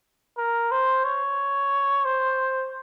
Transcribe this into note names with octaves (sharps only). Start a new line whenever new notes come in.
A#4
C5
C#5
C5